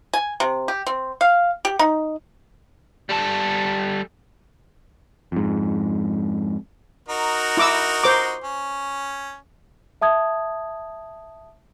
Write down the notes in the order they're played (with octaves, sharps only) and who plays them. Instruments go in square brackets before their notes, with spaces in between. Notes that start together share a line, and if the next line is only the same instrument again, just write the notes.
[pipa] G#5
C3
G4
C4
F5
G4
D#4
[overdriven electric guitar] G3 A4
[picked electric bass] F2 G#2
[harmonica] D#4 F#4 A#4
[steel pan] E4 D6 E6
C5 D6
[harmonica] C#4
[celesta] E5 A5 D#6 G#6